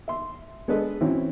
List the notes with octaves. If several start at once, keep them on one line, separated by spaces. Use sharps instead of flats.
E5 C6
G#3 B3 D4 A4 B4 D#5
E3 C4 C#4 E4 F#4